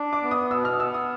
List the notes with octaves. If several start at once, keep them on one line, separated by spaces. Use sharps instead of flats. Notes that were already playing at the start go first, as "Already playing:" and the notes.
Already playing: D4
D6
B3
D#6
B2 E6
F6
B3 E6
D#6